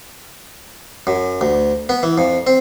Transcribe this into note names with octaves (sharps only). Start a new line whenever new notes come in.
F#2
D2
B3
E3
F2
C4